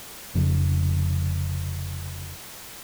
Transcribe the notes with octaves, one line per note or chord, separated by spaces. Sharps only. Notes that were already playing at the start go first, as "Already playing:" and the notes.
F1 F2 C#3